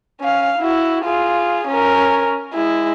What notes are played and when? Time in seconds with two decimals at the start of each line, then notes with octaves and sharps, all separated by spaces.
0.21 C#4 F5
0.59 E4 F#4
1.05 F4 G#4
1.68 C#4 A#4
2.54 G#3 E4